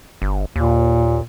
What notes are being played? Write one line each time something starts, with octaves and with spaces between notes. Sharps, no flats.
G1
D#2 A#2